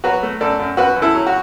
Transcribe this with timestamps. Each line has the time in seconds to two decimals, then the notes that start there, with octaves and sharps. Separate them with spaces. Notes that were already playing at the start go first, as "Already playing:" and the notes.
0.04 F#3 F#4 B4
0.23 A3
0.41 F#2 A4 D5
0.59 F#2
0.77 F#2 F#4 B4
0.96 F#2
1.02 E4 A4
1.15 F#3
1.26 F#4